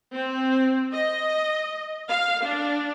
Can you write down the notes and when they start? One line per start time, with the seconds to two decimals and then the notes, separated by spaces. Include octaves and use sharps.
0.14 C4
0.94 D#5
2.08 F5
2.43 D4